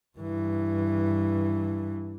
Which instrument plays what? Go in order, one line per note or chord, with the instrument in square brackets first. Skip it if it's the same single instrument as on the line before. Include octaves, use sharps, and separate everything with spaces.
[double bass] G2 E3